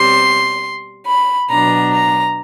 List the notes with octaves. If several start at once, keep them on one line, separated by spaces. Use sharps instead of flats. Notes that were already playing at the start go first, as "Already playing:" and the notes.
Already playing: B2 G3 C4 C6
B5
B2 F#3 B3 D4 A#5
A#5